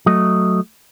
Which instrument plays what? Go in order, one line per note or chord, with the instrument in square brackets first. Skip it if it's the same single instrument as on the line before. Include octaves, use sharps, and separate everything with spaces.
[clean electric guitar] F#3 A3 D#5